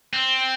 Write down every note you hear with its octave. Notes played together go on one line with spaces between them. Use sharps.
C4